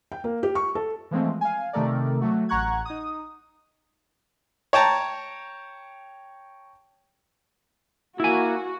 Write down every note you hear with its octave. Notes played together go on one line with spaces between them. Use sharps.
G5
A#3
G4
C#6
A4
E3 F3 G#3 A3 C4
F5 G#5
C3 D#3 A3 A4 A#4 D5
F#3 A3 F#4
A1 F#5 A#5 C#6 F#6 G#6
D#4 D#6
C#5 G5 A5 A#5
A#3 E4 F#4 G#5